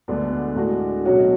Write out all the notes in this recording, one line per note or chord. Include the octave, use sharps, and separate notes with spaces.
D2 D3 G#3 B3 D4
A2 G#3 D4 F#4
B2 F#3 C#4 F#4 C#5